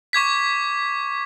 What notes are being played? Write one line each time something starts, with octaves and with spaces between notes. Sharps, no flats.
C#6 D6 G#6 B6